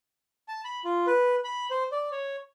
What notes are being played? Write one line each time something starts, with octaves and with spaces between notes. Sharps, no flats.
A5
B5
F4
B4
B5
C5
D5
C#5